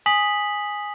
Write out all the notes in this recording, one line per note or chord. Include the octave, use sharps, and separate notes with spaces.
G#5 D#6 B6 F#7